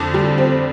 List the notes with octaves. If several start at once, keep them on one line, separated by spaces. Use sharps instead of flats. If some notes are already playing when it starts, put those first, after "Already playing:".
Already playing: F2 D3 D6
G3
C4